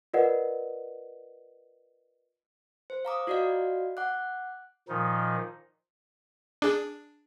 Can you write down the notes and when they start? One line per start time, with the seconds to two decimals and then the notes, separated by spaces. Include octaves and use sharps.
0.14 F4 A#4 B4 D5 D#5 F#5
2.90 C5
3.05 F5 A#5 D6 D#6
3.27 F4 F#4 D5 D#5 F5
3.97 F#5 D6 F#6
4.89 A#2 D#3 F3 D#4
6.62 D4 G#4